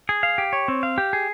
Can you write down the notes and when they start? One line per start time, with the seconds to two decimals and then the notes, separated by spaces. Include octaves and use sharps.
0.09 G#4
0.23 F5
0.38 G4
0.53 C#5
0.68 C4
0.83 F5
0.98 G4
1.13 G#4